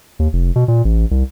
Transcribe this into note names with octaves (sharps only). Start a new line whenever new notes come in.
D#2
F1
B2
A#2
A1
C2